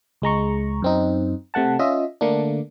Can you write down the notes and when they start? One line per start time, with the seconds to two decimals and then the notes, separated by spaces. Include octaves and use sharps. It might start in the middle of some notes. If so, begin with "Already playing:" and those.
0.22 C#2 G#3 A#5 C#6
0.82 F#2 C4 D#4
1.54 C3 A3 F#5 A5
1.79 C#4 F4 D#5 E5
2.21 D3 A3 A#3 D4